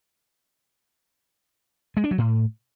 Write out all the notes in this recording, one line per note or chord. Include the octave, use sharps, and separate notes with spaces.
G#3
D4
F#3
A2